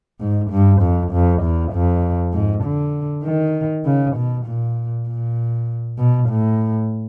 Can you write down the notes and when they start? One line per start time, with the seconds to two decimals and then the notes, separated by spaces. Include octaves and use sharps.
0.20 G#2
0.51 G2
0.81 F2
1.12 F2
1.42 E2
1.72 F2
2.33 G#2
2.64 D3
3.24 D#3
3.85 C#3
4.16 B2
4.46 A#2
5.07 A#2
5.98 B2
6.29 A2